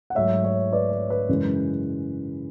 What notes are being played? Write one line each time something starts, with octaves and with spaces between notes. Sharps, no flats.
F#5
G#2 F#3 A3 C#5 E5
C#5
B4 D5
C#5
B4
F#2 C#3 E3 G#3